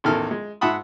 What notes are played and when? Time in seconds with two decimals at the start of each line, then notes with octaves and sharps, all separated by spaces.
0.04 A1 E2 D#3 A4 F6
0.31 G#3
0.61 G#2 E5 F#5 A5 B5 D#6